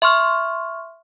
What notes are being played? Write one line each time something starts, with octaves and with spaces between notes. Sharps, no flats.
E5 C6 C#6 F6